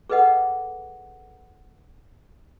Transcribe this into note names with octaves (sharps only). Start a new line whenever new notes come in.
G#4 A4 B4 D#5 F#5